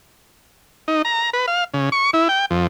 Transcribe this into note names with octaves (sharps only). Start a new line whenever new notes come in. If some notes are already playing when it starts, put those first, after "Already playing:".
D#4
A#5
B4
F5
C#3
C#6
E4
G5
F2